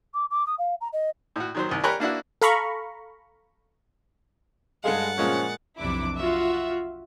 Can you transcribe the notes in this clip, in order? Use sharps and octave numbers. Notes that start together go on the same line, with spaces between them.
D6
D6
D#6
F5
A#5
D#5
A2 F#4
D#3 F#3 C5
C2 D#3
G4 A#4 C#5 G#5 B5 F#6
A#3 D4 E4 F#4
A4 F5 A#5 B5 C#6
G2 G#3 A4 F5 F#5 A6
A#2 F3 G#3 C#4
B1 F2 C3 D4 E4 D6
F4 F#4 E5